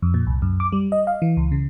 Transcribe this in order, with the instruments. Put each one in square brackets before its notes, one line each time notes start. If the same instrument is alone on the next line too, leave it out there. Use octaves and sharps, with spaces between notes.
[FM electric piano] F2
A#2
C2
F#2
D6
G3
D#5
F5
E3
C#2
C#3